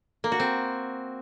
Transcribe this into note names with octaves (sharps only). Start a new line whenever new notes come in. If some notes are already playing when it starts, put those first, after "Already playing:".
A#3
F#4
C4